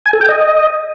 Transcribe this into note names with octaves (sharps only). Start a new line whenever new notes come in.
G#5
A4
G5
D#5